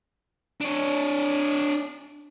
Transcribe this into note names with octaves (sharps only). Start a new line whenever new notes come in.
D4 C#5